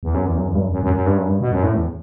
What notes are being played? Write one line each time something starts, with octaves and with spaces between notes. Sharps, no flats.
E2
F#2
E2
F#2
E2
G2
F#2
F#2
F#2
F#2
G2
F#2
G2
B2
F#2
A2
E2